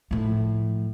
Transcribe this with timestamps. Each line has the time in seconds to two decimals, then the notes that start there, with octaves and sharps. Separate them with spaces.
0.11 A2 F3